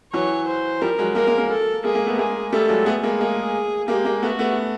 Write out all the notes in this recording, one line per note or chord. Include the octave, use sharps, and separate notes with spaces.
E3 F#3 C#5
C5
F3 G3 A#4
F#3 G#3
G#3 A#3 A#4
G#3 A#3
G#3 A#3
A4
G#3 A#3 G#4
G#3 A#3
A3 B3
G#3 A#3 G#4
G3 A3 A4
F#3 G#3
A3 B3 G#4
G#3 A#3
G#3 A#3 G#4
G#3 A#3 G4
G#3 A#3
A3 B3 F#4
A3 B3